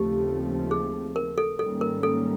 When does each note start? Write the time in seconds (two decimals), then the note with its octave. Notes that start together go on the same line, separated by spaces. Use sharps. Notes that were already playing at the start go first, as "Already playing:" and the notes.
Already playing: D#2 C#3 F3 A3 C4 G4
0.71 G#4
1.16 A#4
1.38 A4
1.59 G#2 D#3 G3 A#3 C#4 A4
1.81 A#4
2.03 A4